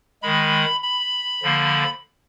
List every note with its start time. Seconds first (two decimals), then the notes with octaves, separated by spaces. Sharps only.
0.22 D#3 G#3 B5
0.82 B5
1.43 D3 F3 A#3